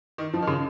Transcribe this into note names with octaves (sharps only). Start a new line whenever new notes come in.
D#3
F3
D#3
C#3